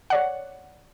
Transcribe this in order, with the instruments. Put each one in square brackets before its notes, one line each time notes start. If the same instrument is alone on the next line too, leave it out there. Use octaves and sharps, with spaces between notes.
[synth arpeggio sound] C#5 D5 F#5